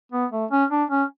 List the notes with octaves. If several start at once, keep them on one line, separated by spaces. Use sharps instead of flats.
B3
A3
C#4
D4
C#4